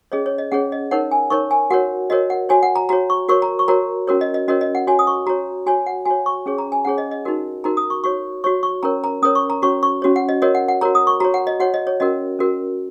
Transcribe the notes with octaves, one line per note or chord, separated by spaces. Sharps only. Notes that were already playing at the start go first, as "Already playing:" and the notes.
C#4 G#4 C#5 D#5
C#5
D#5
C#4 G#4 C#5 F#5
D#5
D#4 A#4 C#5 F#5
G#5
D#4 A#4 C#5 C#6
G#5
F#4 A#4 C#5 F#5
F#4 A#4 C#5 D#5
F#5
F#4 C#5 G#5
F#5
A#5
F#4 C#5 A#5
C#6
F#4 A#4 C#5 C#6
A#5
C#6
F#4 A#4 C#5 A#5
C#4 F#4 A#4 C#5
D#5
D#5
C#4 F#4 A#4 C#5 D#5
D#5
F#5
F#4 C#5 G#5
D#6
C#6
F#4 C#5 A#5
F#4 C#5 G#5
F#5
F#4 C#5 G#5
C#6
C#4 G#4 C#5
A#5
G#5
C#4 G#4 C#5 F#5
D#5
D#5
D#4 F#4 A#4
D#4 F#4 A#4 A#5
D#6
C#6
F#4 C#5 C#6
F#4 C#5 C#6
C#6
C#4 A#4 C#5 A#5
A#5
C#4 A#4 C#5 D#6
C#6
A#5
C#4 F#4 C#5 C#6
C#6
C#4 F#4 C#5
F#5
D#5
F#4 A#4 C#5 D#5
F#5
F#5
F#4 A#4 C#5 A#5
D#6
C#6
F#4 C#5 A#5
F#5
D#5
F#4 C#5 F#5
D#5
C#5
C#4 F#4 A#4 D#5
C#4 F#4 A#4